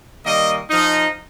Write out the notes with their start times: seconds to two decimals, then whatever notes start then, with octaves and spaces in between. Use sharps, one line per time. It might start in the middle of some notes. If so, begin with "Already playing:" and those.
0.24 D#3 G3 A#3 D#5
0.71 F3 D#4